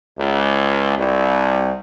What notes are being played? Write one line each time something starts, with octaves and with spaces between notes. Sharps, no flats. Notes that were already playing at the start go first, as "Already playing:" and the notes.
C#2
C2